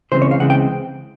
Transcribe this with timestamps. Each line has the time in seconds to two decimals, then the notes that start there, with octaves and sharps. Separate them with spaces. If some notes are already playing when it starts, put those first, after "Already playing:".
0.12 C#2 C#3 E3 G#3 C4 C5
0.22 C#5
0.31 F5
0.40 C#2 C#3 E3 G#3 C4 F#5
0.50 G5